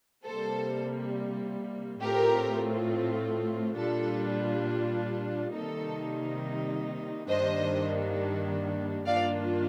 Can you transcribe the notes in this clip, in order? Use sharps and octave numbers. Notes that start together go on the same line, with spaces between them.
C3 G3 A#3 A4 C5
A2 A3 C4 F4 G4 A#4
A#2 G3 D4 F4 A4
C3 D#3 G3 A#3 D#4 A4
G2 D#3 G3 A#3 D4 C5 D#5
G2 D#3 A#3 D4 F4 D5 F5